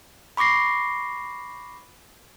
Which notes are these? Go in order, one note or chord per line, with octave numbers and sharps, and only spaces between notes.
B5 C#6 D6 A#6 C7